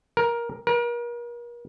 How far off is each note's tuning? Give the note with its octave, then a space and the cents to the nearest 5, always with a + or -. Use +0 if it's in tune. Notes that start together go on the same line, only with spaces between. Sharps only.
A#4 +15
A#4 +40